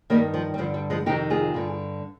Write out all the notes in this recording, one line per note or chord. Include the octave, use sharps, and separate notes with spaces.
G2 D#3 G3 A#3
F3
G3
G2 D3 F3
G3
F3 G#3
F2 C3 D#3 D#4 G4
F4 G#4
G2 D3